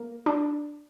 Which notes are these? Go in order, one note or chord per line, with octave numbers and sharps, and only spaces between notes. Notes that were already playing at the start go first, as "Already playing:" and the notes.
Already playing: A#3
D4